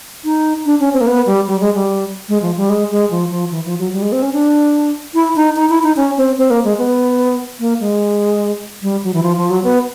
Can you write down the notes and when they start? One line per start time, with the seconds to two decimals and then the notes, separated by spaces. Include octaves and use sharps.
0.24 D#4
0.66 D4
0.80 C#4
0.93 C4
1.01 A#3
1.07 B3
1.27 G3
1.48 G3
1.61 G#3
1.74 G3
2.29 G#3
2.42 F3
2.57 G3
2.70 G#3
2.91 G#3
3.11 F3
3.31 F3
3.51 E3
3.65 F3
3.79 F#3
3.93 G3
4.02 G#3
4.12 C4
4.22 C#4
4.33 D4
5.14 E4
5.36 D#4
5.56 D#4
5.69 E4
5.83 D#4
5.96 C#4
6.18 C4
6.38 C4
6.50 A#3
6.64 G#3
6.78 B3
7.60 A#3
7.80 G#3
8.82 G3
9.03 F#3
9.14 E3
9.23 F3
9.37 F3
9.50 F#3
9.64 B3